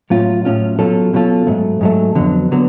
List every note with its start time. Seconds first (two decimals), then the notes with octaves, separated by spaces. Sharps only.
0.10 A2 F#3 C#4 F4
0.45 A2 F#3 C#4 F4
0.79 B2 F#3 C#4 F4 A4
1.13 B2 F#3 C#4 F4 A4
1.47 G#2 F#3 A3
1.81 G#2 F#3 A3
2.15 F2 D3 F#3 B3
2.51 D3 F#3 B3